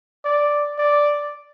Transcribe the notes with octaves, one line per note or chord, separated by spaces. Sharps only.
D5
D5